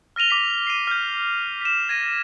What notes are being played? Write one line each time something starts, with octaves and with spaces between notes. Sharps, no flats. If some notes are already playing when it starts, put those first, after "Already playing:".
F6 A#6 D#7 F7 G7
D6 B6
C7 D#7
F6 G6
B6 E7
G#6 A#6 D#7